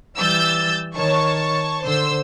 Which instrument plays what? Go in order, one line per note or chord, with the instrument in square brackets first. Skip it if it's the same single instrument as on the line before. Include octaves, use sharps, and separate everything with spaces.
[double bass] E3 G3 [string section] E6 G6 A6
[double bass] D#3 [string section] C#5 A5 C#6
[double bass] D3 [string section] C5 E6